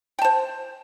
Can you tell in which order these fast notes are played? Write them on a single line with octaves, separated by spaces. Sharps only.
G5 A5 C5